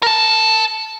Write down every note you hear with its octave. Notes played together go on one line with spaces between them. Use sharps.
A#4 A5